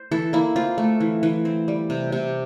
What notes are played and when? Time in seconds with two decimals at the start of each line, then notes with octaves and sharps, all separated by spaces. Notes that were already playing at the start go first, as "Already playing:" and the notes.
Already playing: C5
0.11 E3 A4
0.33 A#3 E4
0.56 C4 F4
0.78 A3
1.00 E3
1.23 E3
1.45 C4
1.68 G3
1.90 C3
2.12 C3